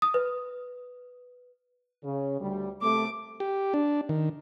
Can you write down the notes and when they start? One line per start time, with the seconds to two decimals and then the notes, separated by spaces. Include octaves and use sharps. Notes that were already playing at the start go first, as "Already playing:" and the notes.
0.02 D#6
0.14 B4
2.04 C#3
2.40 D2 G3
2.82 C3 A3 D6
3.40 G4
3.74 D4
4.09 D#3